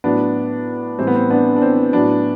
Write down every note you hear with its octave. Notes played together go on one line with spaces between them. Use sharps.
A2 F#3 B3 D4
A2 E3 G3 C4
B3
C4
B3 D4
D4
C4
A2 F#3 B3 D4